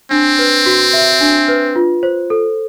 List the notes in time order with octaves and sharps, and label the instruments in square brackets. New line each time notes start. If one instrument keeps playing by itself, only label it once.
[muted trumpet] C4 [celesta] D4
[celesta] B4
F#4
E5
D4
B4
F4
C5
A4